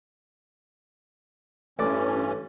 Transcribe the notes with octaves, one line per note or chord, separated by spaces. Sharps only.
A1 G2 E3 C#4 D4 D5